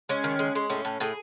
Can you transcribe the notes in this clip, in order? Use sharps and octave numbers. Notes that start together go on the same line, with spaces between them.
G#3 C#4
D#3
G#3
G#3
A2 C#4
A2
A2 G#4